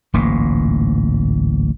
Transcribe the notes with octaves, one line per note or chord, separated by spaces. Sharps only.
D1 A1 G#2 A#3